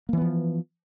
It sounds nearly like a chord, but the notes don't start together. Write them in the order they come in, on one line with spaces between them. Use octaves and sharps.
A#3 E3 B3 F3